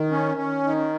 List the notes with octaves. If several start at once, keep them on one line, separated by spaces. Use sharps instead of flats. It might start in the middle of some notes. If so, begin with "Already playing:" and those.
Already playing: D#3
C#4
C#4
D#3